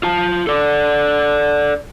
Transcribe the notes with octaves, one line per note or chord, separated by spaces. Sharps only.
F4 A5
A4 D5